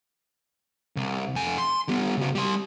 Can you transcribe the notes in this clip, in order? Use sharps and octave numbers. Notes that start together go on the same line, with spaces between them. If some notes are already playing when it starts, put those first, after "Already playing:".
C2
F2 G#5
C6
G3 B3
C#3 F#4
G3 C6